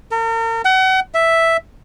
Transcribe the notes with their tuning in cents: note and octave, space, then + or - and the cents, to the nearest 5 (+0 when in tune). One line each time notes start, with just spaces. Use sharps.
A#4 -40
F#5 +35
E5 +0